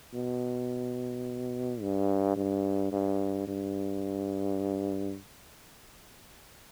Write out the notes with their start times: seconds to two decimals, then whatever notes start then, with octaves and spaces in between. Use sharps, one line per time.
0.14 B2
1.81 G2
2.36 G2
2.92 G2
3.47 G2